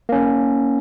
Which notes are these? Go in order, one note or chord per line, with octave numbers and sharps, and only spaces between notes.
A#3 C#4